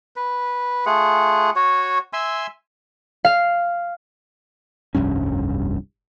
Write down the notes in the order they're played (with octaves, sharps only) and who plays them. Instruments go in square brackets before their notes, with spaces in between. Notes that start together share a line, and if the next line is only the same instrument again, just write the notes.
[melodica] B4
A3 F4 G#4 F#5
F#4 C#5
E5 G#5 C6 E6
[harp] F5
[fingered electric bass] F1 C2 G2 C#4